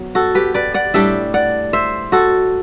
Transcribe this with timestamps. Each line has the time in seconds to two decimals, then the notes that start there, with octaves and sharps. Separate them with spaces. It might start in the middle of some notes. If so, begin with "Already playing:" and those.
Already playing: F#3 B3
0.15 F#4 A4
0.35 G4 B4
0.54 B4 D5
0.74 D5 F#5
0.94 A2 G3 D4 E5 G5
1.34 D5 F#5
1.73 C5 E5
2.12 F#4 A4